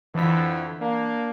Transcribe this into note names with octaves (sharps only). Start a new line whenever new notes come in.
F2 D3 E3 E4 B6
A#3 D4